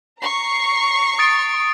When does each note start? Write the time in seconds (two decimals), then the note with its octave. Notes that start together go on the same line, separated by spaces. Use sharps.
0.20 A#5 C#6 C7
1.19 D#6 A6 D7